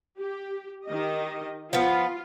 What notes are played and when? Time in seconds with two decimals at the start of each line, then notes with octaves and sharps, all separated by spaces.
0.18 G4
0.87 D#3 G4 D#5
1.73 F3 B3 F4